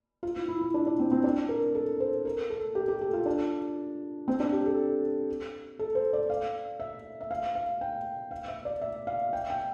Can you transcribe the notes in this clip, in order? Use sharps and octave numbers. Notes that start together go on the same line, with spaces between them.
F4
E4
E4
E4
D4
D4
C4
C4
D4
A#4
A4
C5
A#4
A4
G4
G4
A4
F4
D4
C4
D4
G4
A4
A4
C5
D5
F5
E5
E5
F5
F5
G5
F5
E5
D5
E5
F5
G5
G5